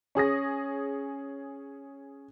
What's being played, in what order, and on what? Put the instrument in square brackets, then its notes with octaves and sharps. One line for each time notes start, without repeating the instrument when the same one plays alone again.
[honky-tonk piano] C#4 G#4 D#6 A#6